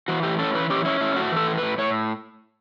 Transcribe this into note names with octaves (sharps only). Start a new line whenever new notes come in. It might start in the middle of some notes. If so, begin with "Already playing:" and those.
E3 F#4
A2 G4
C#4 A4
E3 B4
C#4 G4
C#4 E4
A2 E4
A3 F#4
E3 A4
A2
A2 B4
A2 C#5